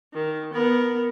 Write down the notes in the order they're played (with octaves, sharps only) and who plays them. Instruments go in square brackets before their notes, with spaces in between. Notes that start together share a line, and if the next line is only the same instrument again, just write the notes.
[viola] D#3
B3 A#4